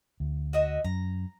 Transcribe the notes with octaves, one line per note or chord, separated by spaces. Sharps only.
D2
F#4 D#5 E5
F#2 A#5